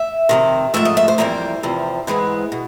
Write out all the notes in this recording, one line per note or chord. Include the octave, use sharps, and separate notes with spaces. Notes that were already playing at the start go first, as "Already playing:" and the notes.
Already playing: E5
F2 C3 D#3
G#2 F3 A3 E5
D#5
E5
C5
F2 C3 E3 G3 A#3 C5
E2 C3 F3
G#2 E3 G#3 B3
B2